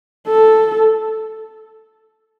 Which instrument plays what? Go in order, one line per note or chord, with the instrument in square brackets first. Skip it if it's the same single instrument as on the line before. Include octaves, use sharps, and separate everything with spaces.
[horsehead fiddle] A4